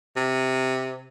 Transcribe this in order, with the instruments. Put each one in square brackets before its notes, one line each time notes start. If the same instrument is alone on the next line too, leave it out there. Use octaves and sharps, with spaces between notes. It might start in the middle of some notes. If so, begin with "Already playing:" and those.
[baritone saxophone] C3